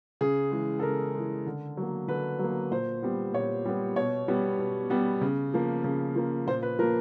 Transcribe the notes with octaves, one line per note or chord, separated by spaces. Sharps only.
C#3 G#4
E3 G#3
A4
C#3 A#4
E3 G#3
D3
F#3 A#3
D3 B4
F#3 A#3
A#2 C5
G3 B3
A#2 C#5
G3 B3
B2 C#5
G3 B3
B2
G3 B3
C#3
F3 A#3
C#3
F3 A#3
A#2 C5
B4
F3 A#3 A#4